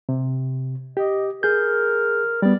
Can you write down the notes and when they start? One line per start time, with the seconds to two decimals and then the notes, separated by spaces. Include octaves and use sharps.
0.09 C3
0.97 G4 D#5
1.43 G#4 A#4 G6
2.42 G3 B3 D5